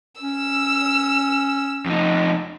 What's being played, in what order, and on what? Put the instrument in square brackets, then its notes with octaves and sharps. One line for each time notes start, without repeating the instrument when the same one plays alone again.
[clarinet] C#4 [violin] E6
[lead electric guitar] F2 D#4